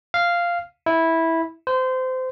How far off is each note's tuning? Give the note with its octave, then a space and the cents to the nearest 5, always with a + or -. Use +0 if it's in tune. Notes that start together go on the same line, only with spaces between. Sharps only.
F5 -5
E4 -10
C5 -25